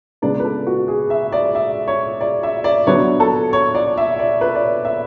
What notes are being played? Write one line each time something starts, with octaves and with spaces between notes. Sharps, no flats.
C#3 G#3 B3 D4 D5
B4
A4
F#4
G#4
E5
D5
E5
C#5
D5
E5
D5
D3 F#3 B3 D4 C#5
A4
C#5
D5
E5
D5
B4
D5
C#5
E5